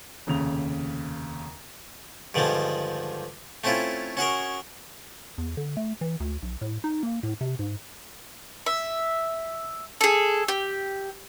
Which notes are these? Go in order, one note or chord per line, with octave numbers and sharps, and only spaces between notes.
F1 D#2 C#3 F7
G2 D3 D#3 F3 G3 G#3
A3 C4 C#4 E4 F4
C#4 F#4 G#4 A#4
E2
D3
A3
E3
D2
B1
A2
D#4
A#3
A2
C3
G#2
E5
G#4 A4
G4